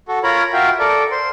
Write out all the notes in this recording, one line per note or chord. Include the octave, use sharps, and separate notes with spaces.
F#4 A4
F4 A#4 C#5 A#5 B5
F4 F#4 A#4 E5 F5 G5
A4 A#4 D5
C5 C6